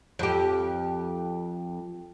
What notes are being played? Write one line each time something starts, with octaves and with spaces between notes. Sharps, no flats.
F2 G4